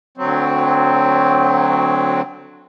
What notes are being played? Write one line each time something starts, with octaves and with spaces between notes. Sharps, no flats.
D2 F#3 C4